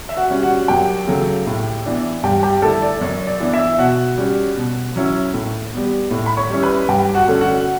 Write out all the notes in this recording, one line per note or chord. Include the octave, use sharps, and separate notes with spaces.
E5
F#4 F#5
G3 C#4
F#4 F#5
F#2 G4 G5
C#3 F#3 A3
A2
E3 B3 D4
G2 G4 G5
G4 G5
D3 A3 E4 A4 A5
D5
F#2 C#5
D5
E3 B3 D4
E4 E5
B2 F#4 F#5
G3 C#4
B2
F#3 C#4 E4
A2
G3 B3
A2
B5
C#5 C#6
G3 C#4 E4
B4 B5
G2 G4 G5
F#4 F#5
D3 A3 C#4
F#4 F#5